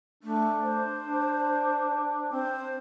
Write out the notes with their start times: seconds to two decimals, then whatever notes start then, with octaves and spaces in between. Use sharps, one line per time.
0.23 A3 D4
0.62 C5
1.03 D4
2.32 C4 C5